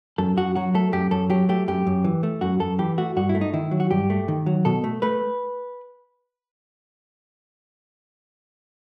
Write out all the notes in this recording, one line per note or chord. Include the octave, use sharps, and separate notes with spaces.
F#2 A4
F#2 F#4
F#3 F#4
A3 A4
F#2 G4
F#2 A4
F#3 G4
A3 G4
F#2 G4
F#2
E3
A3
F#2 F#4
F#2 A4
E3 G4
A3 F#4
G2 F#4
E4
A3
D#4
D#3 E4
F#3
F#4
G2 G4
A3
D#3
F#3
B2 A4
A3
A3 B4